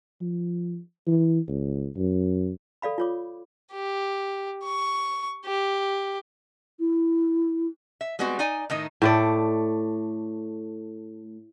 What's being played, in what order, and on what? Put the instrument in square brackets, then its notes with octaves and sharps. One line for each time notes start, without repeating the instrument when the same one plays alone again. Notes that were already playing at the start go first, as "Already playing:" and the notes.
[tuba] F3
E3
C#2
F#2
[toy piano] A4 D5 F5 B5
F4 C#5 D6
[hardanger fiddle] G4
C#6
G4
[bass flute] E4
[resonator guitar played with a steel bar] E5
G3 G#3 B3 C4 F#4
D#4 D5 G#5
A2 D#3 D#4
[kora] A2 A3 D5